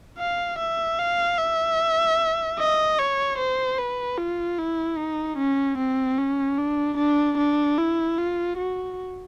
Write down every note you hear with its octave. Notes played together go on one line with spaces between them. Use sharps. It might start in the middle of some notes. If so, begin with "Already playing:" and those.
F5
E5
F5
E5
D#5
C#5
C5
B4
F4
E4
D#4
C#4
C4
C#4
D4
D4
D4
E4
F4
F#4